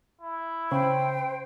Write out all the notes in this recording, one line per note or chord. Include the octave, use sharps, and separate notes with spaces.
E4
C#3 C5 G5